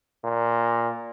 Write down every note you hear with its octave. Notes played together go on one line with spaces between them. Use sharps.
A#2